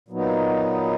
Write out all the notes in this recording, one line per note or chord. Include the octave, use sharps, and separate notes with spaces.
A#2 F#3 B3 D#4